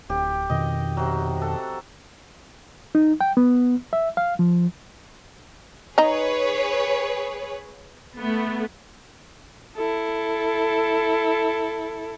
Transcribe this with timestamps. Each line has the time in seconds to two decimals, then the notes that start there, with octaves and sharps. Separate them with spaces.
0.09 D1 G4
0.50 F2 B2 D#3 D#5
0.97 C3 F#3
1.42 A4 F#5
2.95 D#4
3.21 G5
3.37 B3
3.93 E5
4.17 F5
4.39 F3
5.98 D#4 G#4 B4 C#5 D#5 A#5
8.18 A3 B3
9.76 E4 A4